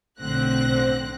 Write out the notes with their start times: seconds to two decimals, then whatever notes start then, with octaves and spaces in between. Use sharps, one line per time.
0.19 B1 A2 D3 C4 F#6 A#6